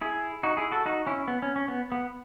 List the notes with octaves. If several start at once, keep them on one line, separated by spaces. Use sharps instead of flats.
E4 G#4
D#4 F#4
E4 G#4
F#4 A4
D#4 F#4
C#4 E4
B3
C#4
C#4
B3
B3